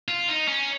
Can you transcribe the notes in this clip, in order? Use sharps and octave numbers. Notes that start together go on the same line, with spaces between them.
F4
D#4
C#4